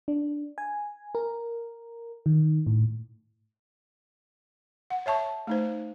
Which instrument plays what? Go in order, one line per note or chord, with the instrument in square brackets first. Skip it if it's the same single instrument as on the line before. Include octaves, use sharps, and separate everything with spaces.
[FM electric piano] D4
G#5
A#4
D#3
A2
[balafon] F#5
C#5 E5 A5 C#6
A3 D#4 C5